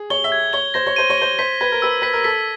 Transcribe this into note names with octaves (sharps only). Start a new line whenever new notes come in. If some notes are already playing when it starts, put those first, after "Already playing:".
Already playing: G#4
C#5 G7
E5
G#6
C#5 G7
C5 A#6
C#5
C5 D#7
C#5
C5 G7
C5 B6
B4 G#6
A#4
B4 E6
B4 B6
A#4
A4 B6